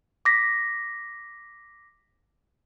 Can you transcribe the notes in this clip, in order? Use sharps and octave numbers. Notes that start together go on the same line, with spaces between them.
D6 A#6 B6